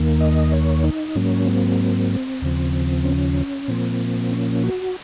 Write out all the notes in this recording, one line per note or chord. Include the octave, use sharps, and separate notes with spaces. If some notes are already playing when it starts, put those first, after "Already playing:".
Already playing: D#2 D#3 A#3
D#5
C#5
D#4
G#2 F#3 A#3 C#4
C4
D#2 C#3 F3
C#4
A#2 F3 A#3 C4
C#4
F#4